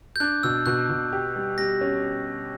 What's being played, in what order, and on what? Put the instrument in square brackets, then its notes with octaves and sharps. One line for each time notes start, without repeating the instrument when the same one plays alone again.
[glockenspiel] G6
[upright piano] D4 [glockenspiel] F#6
[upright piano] B2 [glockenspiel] E6
[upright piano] B2 [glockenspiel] F#6
[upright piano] B2
G4
G3
[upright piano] G3 [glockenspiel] A#6
[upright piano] C#4